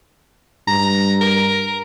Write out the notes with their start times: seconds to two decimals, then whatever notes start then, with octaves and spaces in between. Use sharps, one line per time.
0.68 G2 A#5
1.21 A#4